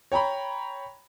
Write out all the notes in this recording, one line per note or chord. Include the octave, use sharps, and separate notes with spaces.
C#5 G5 A#5 B5